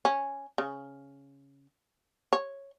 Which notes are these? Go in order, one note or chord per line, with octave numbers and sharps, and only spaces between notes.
C#4
C#3
C#5